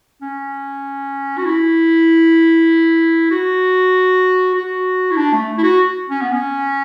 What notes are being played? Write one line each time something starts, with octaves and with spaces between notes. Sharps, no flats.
C#4
F#4
E4
F#4
F#4
E4
D4
A3
E4
F#4
C#4
B3
C#4